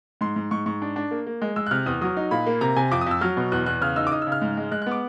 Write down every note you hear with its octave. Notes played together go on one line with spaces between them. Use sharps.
G#2 C6
G#2
G#2 C#6
G#2 C#6
D4
D4
A#3
A#3
G#3
G#3 E6
F#6
C3 F6
E2 D#6
F#3 D#6
D#4
A#2 B5
A#3
C3 A#5
C3 G#5
F2 D6
D#6
F2 E6
F#3 F6
B2
E2 F#6
E2 F#6
C#3 F6
D#4 E6
D6
D#4 D#6
E6
C#3
F6
G#2
G#3
G#3 F#6
F#6
B3 D6